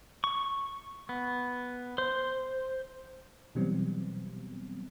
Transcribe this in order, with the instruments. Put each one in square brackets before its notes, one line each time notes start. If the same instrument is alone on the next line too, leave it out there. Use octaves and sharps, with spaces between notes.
[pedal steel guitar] C#6
B3
C5
[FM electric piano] B2 E3 F#3 G3 B3 C4